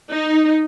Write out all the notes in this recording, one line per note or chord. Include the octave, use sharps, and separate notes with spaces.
D#4